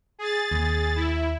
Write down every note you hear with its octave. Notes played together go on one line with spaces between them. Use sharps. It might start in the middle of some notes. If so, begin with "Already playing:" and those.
G#4 A6
D#2
E4